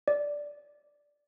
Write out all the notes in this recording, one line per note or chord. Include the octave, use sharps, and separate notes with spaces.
D5